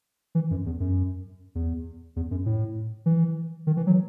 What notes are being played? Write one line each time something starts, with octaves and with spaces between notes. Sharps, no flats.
E3
F#2
E2
F#2
E2
E2
F#2
A2
E3
D#3
E3
F#3